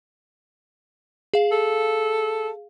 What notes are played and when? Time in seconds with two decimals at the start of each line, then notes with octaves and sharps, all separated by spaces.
1.34 G#4 F5
1.52 A4